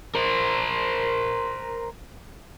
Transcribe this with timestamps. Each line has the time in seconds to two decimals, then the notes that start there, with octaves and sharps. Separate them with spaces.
0.15 A#4 C5